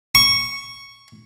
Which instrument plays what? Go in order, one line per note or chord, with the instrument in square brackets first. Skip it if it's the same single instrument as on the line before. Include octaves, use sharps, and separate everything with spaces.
[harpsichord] C#6